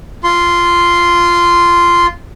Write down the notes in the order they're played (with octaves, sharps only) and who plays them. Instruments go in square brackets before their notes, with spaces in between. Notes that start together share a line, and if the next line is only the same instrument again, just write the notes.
[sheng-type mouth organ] F4 C6